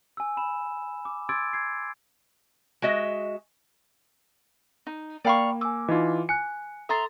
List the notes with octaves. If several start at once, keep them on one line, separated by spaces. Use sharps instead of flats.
G#5 E6
B5 E7
D6
C6 D6 E6 G#6 A6 D7
G6 G#6 C7
G#3 F#4 D#5 E5
D#4
A#3 A#4 D5 F5 G5 B5 C#6
G#5 D6 E6
E3 D#4 F4 D#5
G#5 F#6 C#7
A4 E5 A#5 C6 A6